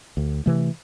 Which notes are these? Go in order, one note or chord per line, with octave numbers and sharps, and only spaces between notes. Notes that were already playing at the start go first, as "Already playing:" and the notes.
D2
C3 E3 A3